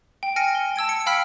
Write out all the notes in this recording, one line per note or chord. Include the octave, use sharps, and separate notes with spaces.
G5
G5 G#5 F6 A#6 C#7 D7
G7
A5 E6 G#6 D7
C#7
F5 G5 B5 E6 F6 B6